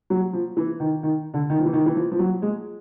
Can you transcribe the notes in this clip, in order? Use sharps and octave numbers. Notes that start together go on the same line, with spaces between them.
F#3
F3
E3
D#3
D#3
D3
D#3
F3
E3
D#3
E3
F3
F3
F#3
G#3